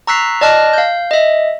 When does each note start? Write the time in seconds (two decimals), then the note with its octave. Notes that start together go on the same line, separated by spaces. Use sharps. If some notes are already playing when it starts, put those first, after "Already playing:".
0.07 A#5 C#6 E6 F#6 B6 C7
0.41 D5 D#5 A5 F6 F#6 A#6
0.73 F5 G6
1.11 D#5 E5